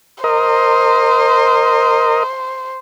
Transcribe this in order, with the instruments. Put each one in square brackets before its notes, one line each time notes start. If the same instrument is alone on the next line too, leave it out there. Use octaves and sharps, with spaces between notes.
[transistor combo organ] A#4 D#5 [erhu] C5